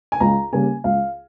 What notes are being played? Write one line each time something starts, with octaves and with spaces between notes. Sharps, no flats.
G#5
C#2 A#5
C#3 G3 A#3 G#5
C#2 F5